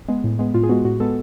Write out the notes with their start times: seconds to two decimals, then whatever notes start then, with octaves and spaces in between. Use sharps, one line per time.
0.08 G#3 B3
0.24 A2
0.39 G#3 B3
0.54 A2 F4
0.63 G#4
0.69 G#3 B3 F#4
0.85 A2 F#4
1.00 G#3 B3 A4